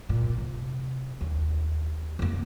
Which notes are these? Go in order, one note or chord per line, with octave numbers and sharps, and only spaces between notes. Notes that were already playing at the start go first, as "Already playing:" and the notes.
A#2
C3
D#2
F2 A#3